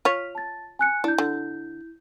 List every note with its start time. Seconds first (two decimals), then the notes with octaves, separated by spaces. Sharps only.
0.05 F4 C#5 F6 B6 F7
0.35 A5 A6
0.79 G#5 F#6 C#7
1.04 D4 E4 G6
1.18 D3